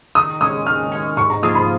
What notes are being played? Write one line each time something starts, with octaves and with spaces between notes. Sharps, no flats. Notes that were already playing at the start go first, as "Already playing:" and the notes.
D#3 D#6
G#3 C#4 D#6
D#3 F6
G#3 C#4
G#2 C#6
A#5
F3 A#3 F4 G#4 D#6
B5